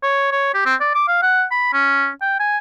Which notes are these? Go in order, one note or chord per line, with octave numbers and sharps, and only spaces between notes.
C#5
C#5
G4
C4
D5
D6
F5
F#5
B5
C#4
G5
G#5